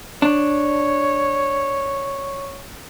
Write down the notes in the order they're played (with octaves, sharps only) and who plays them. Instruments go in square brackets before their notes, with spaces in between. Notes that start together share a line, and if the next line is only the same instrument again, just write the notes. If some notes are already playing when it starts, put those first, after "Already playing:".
[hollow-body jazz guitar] D4 [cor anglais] C#5